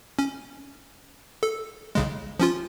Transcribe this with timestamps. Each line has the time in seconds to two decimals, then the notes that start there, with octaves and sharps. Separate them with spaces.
0.19 C#4
1.43 A4
1.95 B1 C#3 G#3
2.40 F3 C#4 F4